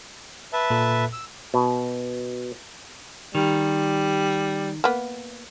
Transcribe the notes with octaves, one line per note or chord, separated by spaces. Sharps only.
B4 E5 A5
A#2 A4
E6
B2
D#3 G3
A#3 B3